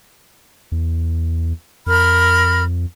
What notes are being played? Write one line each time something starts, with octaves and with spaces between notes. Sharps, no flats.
E2
F2 A#4 B5 F6